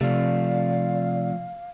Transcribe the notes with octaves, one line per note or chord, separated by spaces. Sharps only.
C3 F3 A3 D5 F5